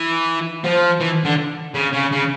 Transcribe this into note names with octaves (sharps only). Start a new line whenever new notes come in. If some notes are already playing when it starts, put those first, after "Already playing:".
Already playing: E3
F3
E3
D3
C#3
C#3
C#3